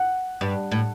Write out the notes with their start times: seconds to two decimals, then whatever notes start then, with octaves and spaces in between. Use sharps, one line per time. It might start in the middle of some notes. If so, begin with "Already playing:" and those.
Already playing: F#5
0.41 G2
0.71 A2